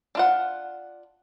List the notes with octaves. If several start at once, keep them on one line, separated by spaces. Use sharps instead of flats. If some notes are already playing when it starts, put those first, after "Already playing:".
D4 F4 F#5